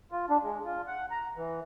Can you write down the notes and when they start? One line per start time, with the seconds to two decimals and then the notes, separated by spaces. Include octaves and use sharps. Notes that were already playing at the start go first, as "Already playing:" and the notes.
0.12 F4
0.30 D4
0.43 G#3
0.65 F4
0.87 F#5
1.11 A#5
1.36 E3